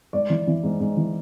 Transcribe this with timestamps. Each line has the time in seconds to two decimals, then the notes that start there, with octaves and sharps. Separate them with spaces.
0.13 G#2 D5
0.30 E3
0.47 E3
0.64 G#2
0.80 G#2
0.97 E3